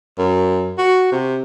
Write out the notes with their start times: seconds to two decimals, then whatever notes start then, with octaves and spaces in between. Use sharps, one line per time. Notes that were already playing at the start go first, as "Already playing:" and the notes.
0.18 F#2
0.78 F#4
1.12 C3